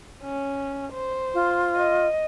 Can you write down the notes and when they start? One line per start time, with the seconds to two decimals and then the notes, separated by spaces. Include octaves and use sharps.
0.22 C#4
0.93 C5
1.34 F4
1.77 D#5